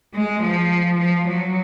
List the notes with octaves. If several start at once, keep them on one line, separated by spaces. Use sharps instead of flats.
G#3
F3
F3
F#3